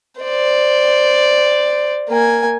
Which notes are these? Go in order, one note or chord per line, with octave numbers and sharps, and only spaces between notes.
C5 D5
A#3 G#5